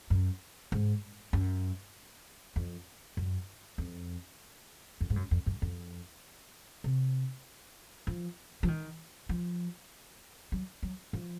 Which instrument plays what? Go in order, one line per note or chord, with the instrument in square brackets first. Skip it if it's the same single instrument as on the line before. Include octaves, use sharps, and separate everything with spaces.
[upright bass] F#2
G#2
F#2
F2
F#2
F2
F2
G#2
F#2
F2
F#2
F2
C3
F3
F3
D#3
F3
F#3
F#3
F3